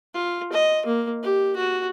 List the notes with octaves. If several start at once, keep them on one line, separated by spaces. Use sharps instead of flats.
F4
D#5
A#3
G4
F#4